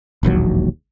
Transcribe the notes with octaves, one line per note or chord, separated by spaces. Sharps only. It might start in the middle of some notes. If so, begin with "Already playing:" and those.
E1 A#1 D#2 F#3